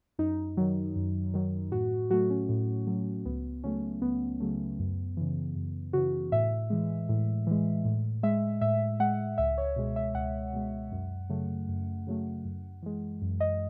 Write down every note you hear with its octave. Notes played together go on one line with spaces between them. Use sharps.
F#2 D#4
D#3 F#3
F#2
D#3 F#3
A2 F#4
F#3 A3 F#4
C#4
A2
F#3 A3
C#2 B3
C#3 F#3 A3 C#4
C#2 B3
C#3 F#3 A3
F#2
C#3 E3
F#2
C#3 E3 F#4
A2 E5
E3 G#3
A2
E3 G#3
A2
G#3 E5
A2 E5
G#3 F#5
C#2 E5
C#5
B2 G#3
E5
C#2 F#5
B2 G#3
F#2
C#3 F#3 A3
F#2
C#3 F#3 A3
F#2
E3 G#3
F#2
D#5